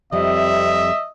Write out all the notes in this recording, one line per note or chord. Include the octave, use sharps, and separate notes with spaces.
F2 C3 G3 D#5 E5